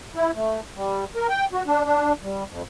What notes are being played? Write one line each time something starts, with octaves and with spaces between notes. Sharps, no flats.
E4
A3
G3
A#4
G5
F#4
D4
D4
G3
F2